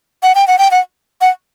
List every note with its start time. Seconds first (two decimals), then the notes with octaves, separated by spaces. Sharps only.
0.23 F#5
0.35 G5
0.47 F#5
0.59 G5
0.71 F#5
1.21 F#5